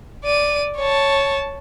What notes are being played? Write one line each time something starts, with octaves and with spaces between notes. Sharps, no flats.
D5 D#7
C#5 A5